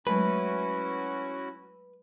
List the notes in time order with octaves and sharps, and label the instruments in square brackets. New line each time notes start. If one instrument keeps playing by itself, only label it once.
[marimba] F#3 G#3 A3 [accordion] C#4 E4 F#4 [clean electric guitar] B4